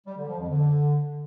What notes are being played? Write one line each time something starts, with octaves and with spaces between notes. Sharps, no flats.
G3
D3
F3
F2
D3